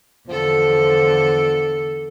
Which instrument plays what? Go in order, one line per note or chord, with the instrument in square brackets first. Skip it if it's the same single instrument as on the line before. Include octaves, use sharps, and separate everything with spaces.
[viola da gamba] E2 D3 A4 [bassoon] F3